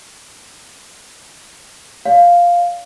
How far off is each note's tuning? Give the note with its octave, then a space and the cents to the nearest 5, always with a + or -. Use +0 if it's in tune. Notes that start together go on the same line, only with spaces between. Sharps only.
D5 -40 F5 +0